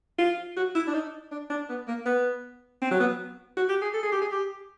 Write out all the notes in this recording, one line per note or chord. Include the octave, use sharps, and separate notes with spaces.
F4
F#4
E4
D4
D#4
D4
D4
B3
A#3
B3
C4
F#3
B3
F#4
G4
G#4
A4
G#4
G4
G#4
G4